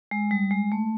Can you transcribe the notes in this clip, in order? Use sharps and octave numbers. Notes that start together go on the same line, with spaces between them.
G#3
G3
G#3
A3